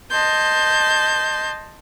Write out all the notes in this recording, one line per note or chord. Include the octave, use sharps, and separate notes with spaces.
D#5 A5 C6 G6